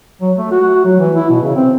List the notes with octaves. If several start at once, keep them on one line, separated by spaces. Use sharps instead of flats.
F#3
A3
F#4
F#3
E3
E4
B2
C#3
C4